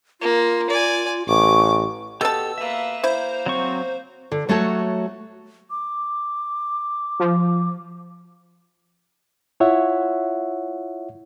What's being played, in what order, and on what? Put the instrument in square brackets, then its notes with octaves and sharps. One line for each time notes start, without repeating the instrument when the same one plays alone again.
[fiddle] A#3 [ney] F4
[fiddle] D5 G#5
[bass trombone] A1 [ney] C#6 [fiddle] D6
[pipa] B2 A5 [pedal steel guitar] G4 A4 [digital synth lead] E6
[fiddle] A#3 B4 [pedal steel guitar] E5
[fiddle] A#3 [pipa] E4 [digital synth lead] C5
[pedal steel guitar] F#3 C4 C#6
[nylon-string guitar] D3
F#3 A3 F#4 C#5 A5
[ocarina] D6
[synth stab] F3
[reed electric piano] E4 F4 C#5 E5 F#5